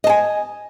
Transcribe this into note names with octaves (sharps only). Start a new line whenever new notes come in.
D#5 G#5 A5